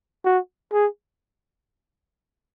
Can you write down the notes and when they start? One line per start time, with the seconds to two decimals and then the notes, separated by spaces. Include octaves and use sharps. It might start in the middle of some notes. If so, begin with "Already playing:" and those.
0.24 F#4
0.72 G#4